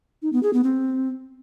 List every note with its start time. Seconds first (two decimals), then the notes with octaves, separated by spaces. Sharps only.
0.22 D#4
0.33 B3
0.43 G#4
0.53 B3
0.64 C4